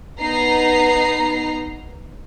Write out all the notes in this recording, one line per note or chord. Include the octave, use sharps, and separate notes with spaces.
B3 D#4 A#5 C7